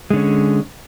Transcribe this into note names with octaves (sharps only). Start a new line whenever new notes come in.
D3 G#3 C#4